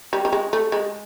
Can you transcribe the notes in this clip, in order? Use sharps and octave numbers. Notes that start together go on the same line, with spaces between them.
G3
G3
G#3
A3
G#3